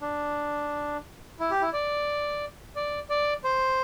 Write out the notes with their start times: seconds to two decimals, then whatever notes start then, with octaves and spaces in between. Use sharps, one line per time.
0.01 D4
1.40 E4
1.51 G4
1.61 E4
1.73 D5
2.76 D5
3.10 D5
3.44 C5